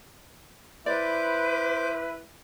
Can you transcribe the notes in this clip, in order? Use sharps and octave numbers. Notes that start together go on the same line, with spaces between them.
E4 B4 C5 D5 D6